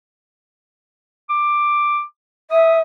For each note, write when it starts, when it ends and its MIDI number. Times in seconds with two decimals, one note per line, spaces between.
1.29 2.02 86
2.51 2.79 76
2.51 2.81 87